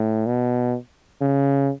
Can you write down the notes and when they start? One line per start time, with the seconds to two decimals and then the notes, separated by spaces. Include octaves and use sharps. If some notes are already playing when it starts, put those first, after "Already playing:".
Already playing: A2
0.26 B2
1.21 C#3